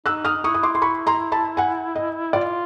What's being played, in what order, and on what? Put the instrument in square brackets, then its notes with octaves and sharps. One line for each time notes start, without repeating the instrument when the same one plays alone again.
[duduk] D#4 [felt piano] E6 F#6
[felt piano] D#6 F6
[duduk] D#4
[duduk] E4 [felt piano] C#6 D#6
[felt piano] D#6
C6 D6
C6
B5 C#6
A#5 C6
A5 B5
F#5 G#5
D#5
[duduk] F4 [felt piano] D5